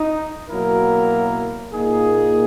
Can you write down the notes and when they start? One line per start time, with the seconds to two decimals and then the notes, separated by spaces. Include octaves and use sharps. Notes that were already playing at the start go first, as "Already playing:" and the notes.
Already playing: D#4
0.50 B2 F#3 A#3 E4 A#4
1.73 A#2 A#3 D#4 G#4